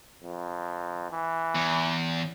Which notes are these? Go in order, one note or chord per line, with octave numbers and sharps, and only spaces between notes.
F2
E3
E2